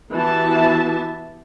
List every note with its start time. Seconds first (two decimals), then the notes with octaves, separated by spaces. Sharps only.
0.13 E3 B3 F#4 G4 E5 A5